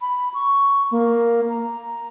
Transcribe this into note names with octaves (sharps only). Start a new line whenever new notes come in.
B5
C#6
A#3
A#5